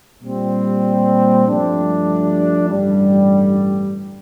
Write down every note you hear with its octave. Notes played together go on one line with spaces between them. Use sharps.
A#2 G3 C4
G2 F3 A3 D4 G4
A1 G2 D3 G3